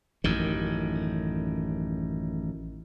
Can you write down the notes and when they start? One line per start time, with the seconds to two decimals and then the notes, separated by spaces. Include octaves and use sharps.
0.24 A1 F#2 D#3